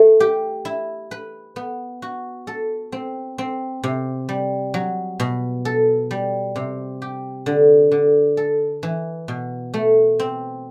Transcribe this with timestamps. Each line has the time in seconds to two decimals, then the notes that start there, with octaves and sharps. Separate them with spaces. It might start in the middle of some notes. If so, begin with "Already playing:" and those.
Already playing: A3
0.20 G4
0.65 E4
1.11 B4
1.56 B3
2.02 F#4
2.47 A4
2.92 C4
3.38 C4
3.84 C3
4.29 G3
4.74 F#3
5.20 B2
5.65 A4
6.11 G3
6.56 C3
7.02 G4
7.46 D3
7.91 D3
8.37 A4
8.83 E3
9.28 B2
9.74 A3
10.19 C4